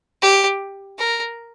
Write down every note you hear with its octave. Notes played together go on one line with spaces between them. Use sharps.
G4
A#4